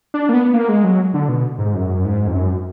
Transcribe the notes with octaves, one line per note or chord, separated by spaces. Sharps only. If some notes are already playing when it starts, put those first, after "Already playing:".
D4
A#3
B3
A#3
G#3
F#3
D3
B2
G#2
F#2
G#2
F2
F#2